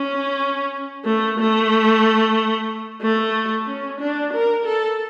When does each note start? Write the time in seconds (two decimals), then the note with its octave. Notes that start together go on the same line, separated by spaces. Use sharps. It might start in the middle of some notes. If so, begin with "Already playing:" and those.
Already playing: C#4
1.05 A3
1.39 A3
3.02 A3
3.67 C#4
4.00 D4
4.33 A#4
4.65 A4